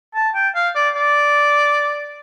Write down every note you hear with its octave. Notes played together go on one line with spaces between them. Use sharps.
A5
G5
F5
D5
D5